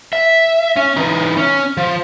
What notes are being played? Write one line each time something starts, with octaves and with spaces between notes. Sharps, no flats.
E5
C#4
E3 D#4
C#4
F3